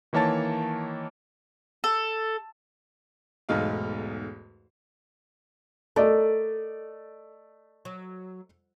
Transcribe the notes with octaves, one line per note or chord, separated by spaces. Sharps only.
D#3 E3 A#3 C#5 A5 A6
A4
B1 E2 G#2 A3 D#4 F5
A3 A4 A#4 D5 D#5
F#3